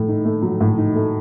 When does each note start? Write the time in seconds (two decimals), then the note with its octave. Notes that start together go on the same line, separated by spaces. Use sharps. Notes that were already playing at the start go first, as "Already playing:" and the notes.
Already playing: A2 A3
0.08 D#4
0.25 A3
0.42 F#3
0.61 A2
0.78 D#4
0.95 A3